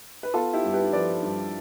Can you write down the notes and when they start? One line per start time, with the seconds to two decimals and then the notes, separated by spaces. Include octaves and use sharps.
0.23 B4
0.34 B3 F4 A4
0.53 E4 G4
0.63 G2
0.73 G4 B4
0.93 F3 B4 D5
1.22 G2